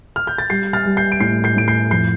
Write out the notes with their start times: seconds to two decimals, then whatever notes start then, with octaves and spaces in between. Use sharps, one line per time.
0.16 F6
0.27 G6
0.38 A6
0.50 G3 G6 C7
0.73 F6 A6
0.85 G3
0.97 G6 C7
1.12 D7
1.20 A2 G6 C7
1.44 G6 C7
1.56 A2 D7
1.68 G6 C7
1.91 F2 G6 C7